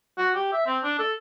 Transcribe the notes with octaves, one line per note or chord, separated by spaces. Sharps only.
F#4
G4
E5
C4
D4
A4